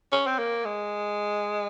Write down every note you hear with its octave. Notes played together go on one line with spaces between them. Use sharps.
C#4
C4
A#3
G#3